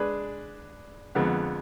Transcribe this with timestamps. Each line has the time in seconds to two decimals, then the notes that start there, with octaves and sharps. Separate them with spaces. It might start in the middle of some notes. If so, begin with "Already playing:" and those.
Already playing: G#3 D4 G#4 B4
1.15 F2 D3 G#3 B3